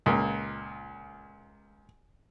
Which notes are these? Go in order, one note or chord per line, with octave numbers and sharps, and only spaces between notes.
C#2 A#2